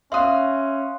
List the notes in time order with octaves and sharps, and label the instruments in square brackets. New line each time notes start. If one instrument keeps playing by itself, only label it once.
[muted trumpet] C#4 [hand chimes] E5 [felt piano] F5 D#6 [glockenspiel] C6 F#6